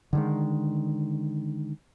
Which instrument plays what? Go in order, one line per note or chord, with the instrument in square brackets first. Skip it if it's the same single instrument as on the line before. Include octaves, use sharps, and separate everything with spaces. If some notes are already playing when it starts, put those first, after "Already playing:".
[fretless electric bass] D3 D#3 G#3